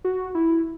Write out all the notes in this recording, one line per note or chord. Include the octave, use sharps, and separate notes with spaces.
F#4
E4